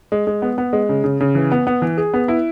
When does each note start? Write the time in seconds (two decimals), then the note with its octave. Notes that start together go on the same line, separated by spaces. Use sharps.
0.12 G#3
0.27 G#3
0.42 B3
0.58 B3
0.73 G#3
0.89 C#3
1.04 C#3
1.21 C#3
1.35 E3
1.52 B3
1.67 B3
1.82 E3
1.97 G#4
2.14 B3
2.28 E4